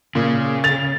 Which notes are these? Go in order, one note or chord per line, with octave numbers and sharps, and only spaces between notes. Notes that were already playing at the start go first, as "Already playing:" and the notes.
A#2 C#3
A6 F7